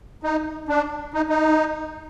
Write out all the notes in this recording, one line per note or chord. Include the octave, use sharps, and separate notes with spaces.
D#4
D4
D#4
D#4